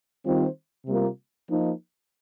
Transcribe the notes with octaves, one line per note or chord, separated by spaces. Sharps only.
D#3 G3 C4 F4 C5
C3 G3 A#3 F4
F3 A#3 D#4